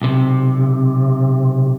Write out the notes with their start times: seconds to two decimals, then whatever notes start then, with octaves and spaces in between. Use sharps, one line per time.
0.01 B1 C3